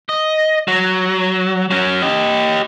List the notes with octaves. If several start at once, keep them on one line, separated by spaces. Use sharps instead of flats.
D#5
F#3
F#3 C#4
G4 D#5